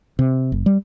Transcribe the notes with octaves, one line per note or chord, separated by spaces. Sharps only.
C3
F#1
G3